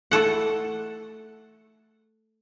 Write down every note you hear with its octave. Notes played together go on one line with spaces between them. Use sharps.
A3 E4 A4 F#5